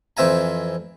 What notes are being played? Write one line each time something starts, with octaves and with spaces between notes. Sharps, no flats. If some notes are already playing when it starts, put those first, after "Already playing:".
F2 E3 C4 E5 G#5 A#5